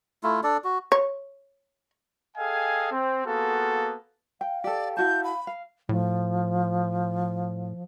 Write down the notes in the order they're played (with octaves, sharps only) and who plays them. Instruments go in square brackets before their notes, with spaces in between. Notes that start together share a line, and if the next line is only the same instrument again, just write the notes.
[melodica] A3 E4 F4
D4 A4 D5
F#4
[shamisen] C#5
[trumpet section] G#4 A4 D#5 F5 G5 G#5
C4
A#3 B3 F4 F#4 G#4 A4
[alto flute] F5 [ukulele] G5
[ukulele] G4 A4 [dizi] D5
[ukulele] E4 F#4 A5 [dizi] G6
[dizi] B5
[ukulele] F5
[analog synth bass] A2 [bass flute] F3